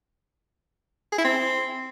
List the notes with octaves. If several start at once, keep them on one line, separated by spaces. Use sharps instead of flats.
G#4
E4
C4